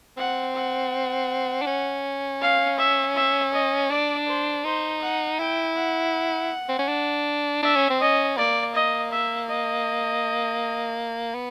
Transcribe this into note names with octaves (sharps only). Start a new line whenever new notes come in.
C4 F#5
F#5
D4
C#4
F5
E5
E5
D#5
D4 D5
C5
D#4 C5
F#5
E4 G5
F#5
C4
C#4
D4
D4 E5
C#4
C4
C#4 D#5
A#3 D5
D#5
E5
D#5
B3